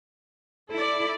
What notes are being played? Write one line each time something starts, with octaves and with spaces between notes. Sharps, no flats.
E4 A4 D5